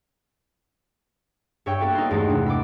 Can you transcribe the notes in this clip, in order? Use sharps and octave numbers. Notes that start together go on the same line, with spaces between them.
G2 C#5 E5 G5
A#3 B3 F#4 G4 A4
D#4 C6
E2 G2 G#3 A3 D4 D#4
C3 B3 D4
E5 B5 C6 D6